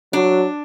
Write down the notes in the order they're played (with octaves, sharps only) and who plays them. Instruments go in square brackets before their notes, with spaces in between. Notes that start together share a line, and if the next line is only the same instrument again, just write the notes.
[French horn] F#3 [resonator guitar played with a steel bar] D4